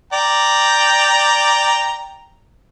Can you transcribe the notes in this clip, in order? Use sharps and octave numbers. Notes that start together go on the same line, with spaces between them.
D5 G5 A#5